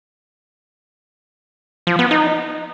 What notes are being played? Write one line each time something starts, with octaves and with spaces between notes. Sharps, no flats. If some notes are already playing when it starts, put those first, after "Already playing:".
F3
B3
D#4